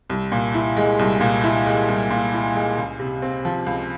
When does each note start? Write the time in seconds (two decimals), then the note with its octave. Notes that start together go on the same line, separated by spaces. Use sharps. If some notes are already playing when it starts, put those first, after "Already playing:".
0.10 C2
0.32 A#2
0.54 E4
0.77 G#3
0.99 C2
1.21 A#2
1.44 E4
1.66 G#3
1.88 C2
2.10 A#2
2.33 E4
2.55 G#3
2.78 C#2
2.99 C3
3.22 C4
3.45 F3
3.66 C#2